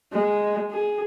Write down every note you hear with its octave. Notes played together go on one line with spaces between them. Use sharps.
G#3
G#4